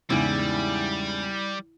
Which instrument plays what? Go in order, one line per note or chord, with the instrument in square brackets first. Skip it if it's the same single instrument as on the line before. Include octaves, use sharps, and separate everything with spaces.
[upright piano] E2 G#2 C#3 [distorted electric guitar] G3 [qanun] E4